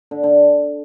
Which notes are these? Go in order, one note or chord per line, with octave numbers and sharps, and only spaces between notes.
D3
D3